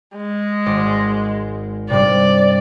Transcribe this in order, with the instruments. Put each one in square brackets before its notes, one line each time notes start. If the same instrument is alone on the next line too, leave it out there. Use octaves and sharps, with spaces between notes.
[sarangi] G#3
[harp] G#1 D5 C6
[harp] G2 C3 [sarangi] D5